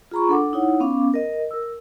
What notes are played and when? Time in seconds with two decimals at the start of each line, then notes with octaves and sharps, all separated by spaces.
0.11 F4 G#4 A#5 B5 C#6
0.28 D4 A4 F#5 D6
0.53 D#4 E4 C#5 F#5
0.80 B3 C#4 F5 D6
1.14 A#4 D#5
1.51 A#4 E6